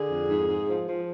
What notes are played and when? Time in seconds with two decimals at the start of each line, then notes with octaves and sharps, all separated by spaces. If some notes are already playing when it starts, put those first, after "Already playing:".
Already playing: D3 G#4
0.09 F2
0.28 G#2
0.47 G#2
0.68 F3
0.88 F3